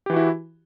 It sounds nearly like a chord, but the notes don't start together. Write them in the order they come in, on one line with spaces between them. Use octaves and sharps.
G4 E3 F#4 E4